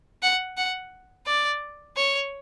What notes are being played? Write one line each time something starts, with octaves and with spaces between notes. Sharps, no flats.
F#5
F#5
D5
C#5